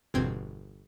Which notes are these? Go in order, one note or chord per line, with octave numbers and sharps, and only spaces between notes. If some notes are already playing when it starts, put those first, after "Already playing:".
G1 E2 B2 C4 G#6